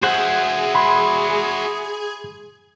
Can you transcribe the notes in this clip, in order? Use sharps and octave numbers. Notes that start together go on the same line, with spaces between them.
F#4 G#4 C5 E5 F#5
B5 C6